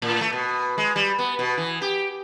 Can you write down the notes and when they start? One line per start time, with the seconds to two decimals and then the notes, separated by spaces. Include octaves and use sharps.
0.02 A2
0.21 A3
0.33 B2
0.78 G#3
0.96 G3
1.19 B3
1.39 B2
1.57 E3
1.82 G4